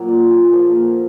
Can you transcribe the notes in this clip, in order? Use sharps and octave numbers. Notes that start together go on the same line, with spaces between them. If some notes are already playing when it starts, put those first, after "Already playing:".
Already playing: A#2 F#3
D5
G#4
A#2 F3 A4
A#4